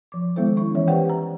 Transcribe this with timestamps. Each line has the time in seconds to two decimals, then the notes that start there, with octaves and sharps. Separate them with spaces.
0.12 F3 D6
0.36 D#3 G#3 B3 E4 A4 C5
0.57 C#4 C#6
0.75 E3 C#5 E5
0.88 G4 B4 C5 D5 F#5 G5
1.09 A#5